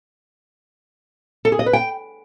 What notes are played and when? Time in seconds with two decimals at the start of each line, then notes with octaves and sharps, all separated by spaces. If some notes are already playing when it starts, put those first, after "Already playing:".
1.45 A4
1.52 G#4
1.59 D#5
1.66 B4
1.73 G5